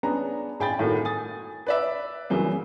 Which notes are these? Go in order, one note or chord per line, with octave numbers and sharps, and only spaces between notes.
B3 C#4 D4 G#4 A#5
A1 G#4 G5 B5 A6
A2 D#3 A3 A#3 F#4
G#5 D#6 A6
B4 D5 E5
F#2 C#3 E3 F#3 A#3